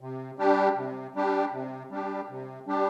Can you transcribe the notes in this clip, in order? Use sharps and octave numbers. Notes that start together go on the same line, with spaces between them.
C3
G3 D4 G4
C3
G3 D4 G4
C3
G3 D4 G4
C3
G3 D4 G4